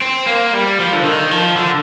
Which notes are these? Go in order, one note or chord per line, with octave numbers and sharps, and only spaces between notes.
C4
A#3
G3
F3
D3
D#3
F3
D3